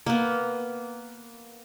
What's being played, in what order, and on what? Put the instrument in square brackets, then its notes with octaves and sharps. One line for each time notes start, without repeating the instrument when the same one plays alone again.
[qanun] A#3 B3